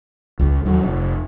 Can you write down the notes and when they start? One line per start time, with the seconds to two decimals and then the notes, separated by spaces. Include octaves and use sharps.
0.39 C#2
0.65 D#2 F#3
0.84 F1